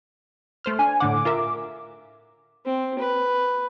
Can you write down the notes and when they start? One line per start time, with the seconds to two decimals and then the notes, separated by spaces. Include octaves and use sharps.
0.65 A3 C5 F6
0.79 D4 G#5
1.00 A2 D3 F#5 D6
1.25 F4 A#4 E5
2.65 C4
2.99 B4